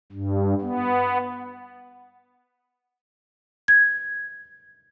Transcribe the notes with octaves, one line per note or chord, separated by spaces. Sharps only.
G2
B3
G#6